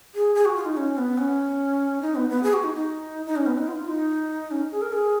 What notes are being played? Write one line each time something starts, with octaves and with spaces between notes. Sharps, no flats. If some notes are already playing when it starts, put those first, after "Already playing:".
G#4
G#4
F#4
F4
D#4
C#4
B3
C#4
D#4
B3
B3
G#4
F#4
D#4
D#4
D#4
C#4
B3
D#4
F4
D#4
C#4
G#4
A#4
G#4